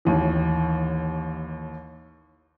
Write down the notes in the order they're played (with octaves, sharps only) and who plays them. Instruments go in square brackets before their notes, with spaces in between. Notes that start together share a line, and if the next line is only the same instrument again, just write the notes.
[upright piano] A1 D#2 E3